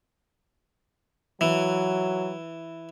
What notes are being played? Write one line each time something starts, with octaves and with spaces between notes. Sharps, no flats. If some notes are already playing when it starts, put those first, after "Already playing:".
E3 F#3